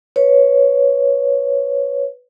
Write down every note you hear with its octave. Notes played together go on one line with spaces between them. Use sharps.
B4 C#5